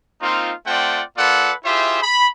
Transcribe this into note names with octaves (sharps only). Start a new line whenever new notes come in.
A#3 C4 D#4 F4
A3 C4 F4 D5 F#5 G5
A#3 F4 A4 B4 D5 F#5
E4 F4 G4 G#4 C5 E5
B5